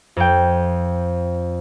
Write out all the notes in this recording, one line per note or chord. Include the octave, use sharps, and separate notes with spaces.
F2 G5